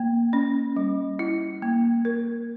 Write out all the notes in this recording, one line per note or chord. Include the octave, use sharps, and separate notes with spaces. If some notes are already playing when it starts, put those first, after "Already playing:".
Already playing: A#3
C#4
G3
E4
A#3
A#4